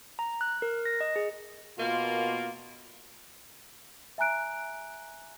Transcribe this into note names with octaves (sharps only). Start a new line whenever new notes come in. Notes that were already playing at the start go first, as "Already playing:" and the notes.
A#5
F#6
A#4
A#6
D#5
G#4
B2 A#3 F4
E5 G#5 A#5 F#6 D7